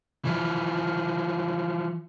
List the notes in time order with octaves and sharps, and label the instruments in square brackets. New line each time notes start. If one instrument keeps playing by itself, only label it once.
[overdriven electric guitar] E3 F3